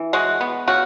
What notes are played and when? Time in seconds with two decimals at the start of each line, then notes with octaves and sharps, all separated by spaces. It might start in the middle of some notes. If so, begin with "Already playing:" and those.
Already playing: E3
0.13 G#3 F#4
0.41 B3
0.68 C#3 F#4